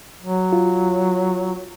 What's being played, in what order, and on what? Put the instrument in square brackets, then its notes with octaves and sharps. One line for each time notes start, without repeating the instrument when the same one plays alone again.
[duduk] F#3
[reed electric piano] F4